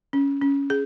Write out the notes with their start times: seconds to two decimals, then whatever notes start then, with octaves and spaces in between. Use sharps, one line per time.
0.13 C#4
0.42 C#4
0.70 G#4